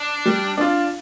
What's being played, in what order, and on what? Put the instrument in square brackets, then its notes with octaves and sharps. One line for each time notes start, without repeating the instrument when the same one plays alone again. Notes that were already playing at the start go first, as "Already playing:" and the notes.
Already playing: [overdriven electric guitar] D4
[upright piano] G3
D4 F4